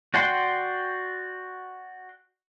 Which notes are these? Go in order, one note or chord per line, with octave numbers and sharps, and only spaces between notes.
F#4 D5 F#5 G5 C6